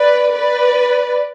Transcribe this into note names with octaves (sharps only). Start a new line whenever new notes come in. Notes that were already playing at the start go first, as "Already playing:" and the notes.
Already playing: B4 D5
B4 D5